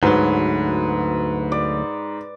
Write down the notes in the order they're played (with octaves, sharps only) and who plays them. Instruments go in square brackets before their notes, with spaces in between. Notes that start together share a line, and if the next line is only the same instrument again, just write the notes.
[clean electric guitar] D2 F#3 [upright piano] G#2 [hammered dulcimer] B4
[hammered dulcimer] D5